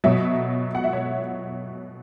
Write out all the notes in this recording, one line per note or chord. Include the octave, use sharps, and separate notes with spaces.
B2 F#3 E5
F#5
E5
C#5